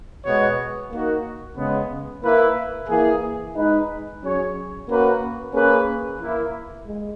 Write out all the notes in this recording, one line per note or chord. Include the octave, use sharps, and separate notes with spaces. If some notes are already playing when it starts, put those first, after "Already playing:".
B2 G#3 B3 F#4 C#5
A#3 D#4 F#4
C#3 G#3 B3
A#3 E4 B4
E3 A#3 E4 G#4
G#3 D#4 G#4 B4
F#3 C#4 G#4 C#5
A#3 C#4 F#4 B4
A#3 C#4 G#4 B4
E3 A#3 E4
G#3